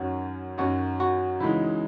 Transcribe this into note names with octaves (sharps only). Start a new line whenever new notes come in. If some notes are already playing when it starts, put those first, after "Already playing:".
Already playing: F#2 D#3 F#3 C#4 F#4
F#2 D#3 F#3 C#4 F#4
F#4
C#2 C#3 E3 G#3 D#4 E4